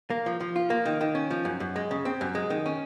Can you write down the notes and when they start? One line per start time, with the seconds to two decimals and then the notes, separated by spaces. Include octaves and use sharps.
0.10 A#3
0.26 F3
0.40 F3
0.56 F4
0.70 A#3
0.86 D#3
1.01 D#3
1.15 C#4
1.31 F3
1.45 F#2
1.60 F#2
1.76 G#3
1.91 C#3
2.05 C4
2.21 F#2
2.35 G#3
2.50 D#3
2.66 C#4